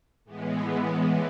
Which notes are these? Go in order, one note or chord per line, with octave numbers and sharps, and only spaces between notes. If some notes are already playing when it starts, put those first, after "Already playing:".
A2 E3 G#3 B3